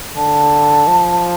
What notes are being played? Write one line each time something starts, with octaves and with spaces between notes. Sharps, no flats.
D3 A5
F3